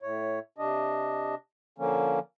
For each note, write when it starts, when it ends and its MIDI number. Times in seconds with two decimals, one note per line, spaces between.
0.02 0.39 45
0.02 0.39 73
0.58 1.35 48
0.58 1.35 62
0.58 1.35 75
1.78 2.19 50
1.78 2.19 53
1.78 2.19 58
1.78 2.19 61